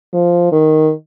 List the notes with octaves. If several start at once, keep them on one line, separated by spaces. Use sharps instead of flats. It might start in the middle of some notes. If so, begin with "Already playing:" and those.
F3
D#3